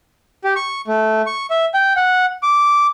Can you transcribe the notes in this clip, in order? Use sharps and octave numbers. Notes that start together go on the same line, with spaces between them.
G4
C#6
A3
C#6
E5
G5
F#5
D6